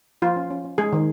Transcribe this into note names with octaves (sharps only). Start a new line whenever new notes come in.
F3 F4
C#4
C#4
C#4
G#3 G#4
D#3